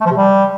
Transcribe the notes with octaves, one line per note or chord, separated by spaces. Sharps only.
A3
F3
C3
G3